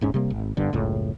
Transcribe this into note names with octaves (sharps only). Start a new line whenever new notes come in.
D#1 G#2 C#4
C3 G3 A#3
G#1
G1 G2 D3
F#1 C#2 A2